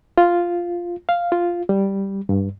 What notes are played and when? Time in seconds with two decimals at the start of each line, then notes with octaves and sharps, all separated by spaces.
0.18 F4
1.09 F5
1.32 F4
1.69 G3
2.29 G2